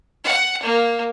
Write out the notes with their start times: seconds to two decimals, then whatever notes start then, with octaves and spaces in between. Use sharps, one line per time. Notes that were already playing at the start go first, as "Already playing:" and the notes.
0.24 F#5
0.63 A#3